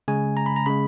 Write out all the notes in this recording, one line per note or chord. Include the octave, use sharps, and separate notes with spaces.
C#3 G#3 G#5
A#5
B5
A#5
C#3 G#3 B5